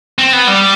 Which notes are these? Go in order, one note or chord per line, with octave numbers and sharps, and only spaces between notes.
C4
B3
G3